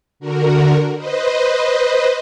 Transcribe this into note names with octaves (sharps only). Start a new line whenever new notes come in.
D3 F#4 A#4
B4 C5 D#5